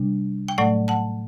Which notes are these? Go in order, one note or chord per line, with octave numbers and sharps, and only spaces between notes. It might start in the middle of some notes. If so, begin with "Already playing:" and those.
Already playing: C3 G3 D4
G5
A2 F#3 A3 D5 F#5
F#5 A5